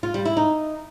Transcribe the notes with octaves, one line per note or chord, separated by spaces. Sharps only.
F4
G3
E4
D#4